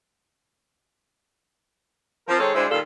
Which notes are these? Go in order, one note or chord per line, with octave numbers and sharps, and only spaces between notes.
F3 C4 A#4
D#3 G#3 G#4 A4 C5 C#5
D2 G#3 D4 E4 C5
G2 A#2 D#3 G3 F4 A4